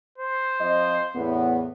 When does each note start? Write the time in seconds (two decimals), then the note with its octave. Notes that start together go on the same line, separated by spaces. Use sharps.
0.18 C5
0.61 F3 C4 D#5
1.16 E2 A2 B3